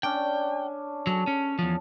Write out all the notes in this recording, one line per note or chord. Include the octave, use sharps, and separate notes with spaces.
C#4 D4 G5
F#3 G#4 A4 C#5
C#4
E2 F3